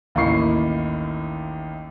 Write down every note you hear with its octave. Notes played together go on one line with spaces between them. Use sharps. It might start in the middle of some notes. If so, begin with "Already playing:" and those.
A1 D#2 A#3 E4 C#6 C7